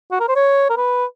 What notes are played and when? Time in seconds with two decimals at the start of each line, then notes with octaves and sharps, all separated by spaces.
0.11 F#4
0.20 A#4
0.28 C5
0.36 C#5
0.70 A#4
0.77 B4